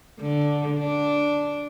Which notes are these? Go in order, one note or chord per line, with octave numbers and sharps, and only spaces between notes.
D3
D4